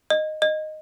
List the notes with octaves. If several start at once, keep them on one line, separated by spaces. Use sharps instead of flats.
D#5
D#5